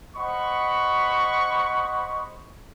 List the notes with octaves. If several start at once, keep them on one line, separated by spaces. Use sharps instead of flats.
C5 D#5 F#5 B5 C#6